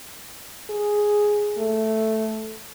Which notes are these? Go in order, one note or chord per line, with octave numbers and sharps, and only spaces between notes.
G#4
A3